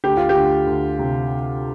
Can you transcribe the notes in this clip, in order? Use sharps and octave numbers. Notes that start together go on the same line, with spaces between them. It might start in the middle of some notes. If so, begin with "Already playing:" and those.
D2 G4
F4
G4
D2
D2
C3